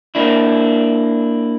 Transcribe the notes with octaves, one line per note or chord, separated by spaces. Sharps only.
A#3 D4 E4